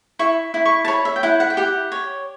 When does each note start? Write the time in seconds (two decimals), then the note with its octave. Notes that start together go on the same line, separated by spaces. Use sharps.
0.19 E4 C#6
0.54 E4
0.66 C#6
0.85 A5
0.88 C#5 B5
1.05 E5
1.16 G5
1.23 E4 F#5
1.40 F#5
1.50 G5
1.57 G4 F#5
1.92 C#5